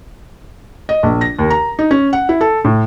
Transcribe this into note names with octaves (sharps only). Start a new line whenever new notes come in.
D#5
A#1
A#6
D#2
A#5
D#4
C#4
F#5
E4
A4
A2